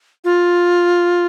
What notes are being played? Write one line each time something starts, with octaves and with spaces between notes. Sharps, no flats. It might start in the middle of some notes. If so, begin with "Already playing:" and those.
F4